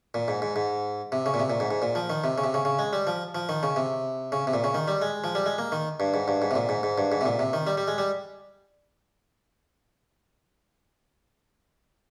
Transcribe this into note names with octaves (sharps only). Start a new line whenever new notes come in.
A#2
G#2
G#2
G#2
C3
C#3
A#2
C3
A#2
G#2
G#2
A#2
F3
D#3
C3
C#3
C3
C#3
C#3
G#3
G3
F3
F3
D#3
C#3
C3
C#3
C3
A#2
C#3
D#3
G3
G#3
F3
G3
G#3
A#3
D#3
G2
G#2
G2
G#2
C3
A#2
G#2
G#2
G2
G#2
C3
A#2
C3
D#3
G3
G3
G#3
G3